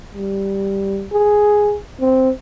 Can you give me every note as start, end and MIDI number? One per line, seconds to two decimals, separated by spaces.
0.15 1.06 55
1.12 1.77 68
2.01 2.30 60